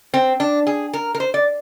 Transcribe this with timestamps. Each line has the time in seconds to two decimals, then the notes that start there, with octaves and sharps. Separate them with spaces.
0.14 C4
0.40 D4
0.67 G#4
0.94 A#4
1.15 A#4
1.20 C5
1.34 D5